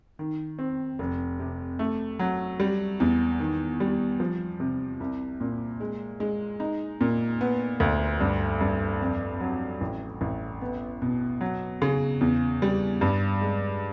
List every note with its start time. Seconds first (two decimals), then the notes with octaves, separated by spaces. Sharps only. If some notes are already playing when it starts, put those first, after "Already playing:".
0.19 D#3
0.59 C4
0.99 F1
1.39 C3
1.79 A3
2.19 F#3
2.60 G3
3.00 E2
3.39 D#3
3.80 G3
4.20 F3
4.60 C3
5.00 C2
5.40 A#2
5.80 G#3
6.20 G#3
6.60 D#4
7.01 A#2
7.41 B3
7.80 D2
8.20 G2
8.61 G2
9.01 F2
9.41 F#3
9.81 A1
10.21 A1
10.61 B3
11.02 B2
11.41 F#3
11.82 C#3
12.21 E2
12.62 G3
13.01 G2
13.41 G#3